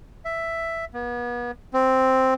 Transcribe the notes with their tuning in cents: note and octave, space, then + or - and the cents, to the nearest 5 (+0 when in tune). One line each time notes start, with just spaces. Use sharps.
E5 +5
B3 -35
C4 +0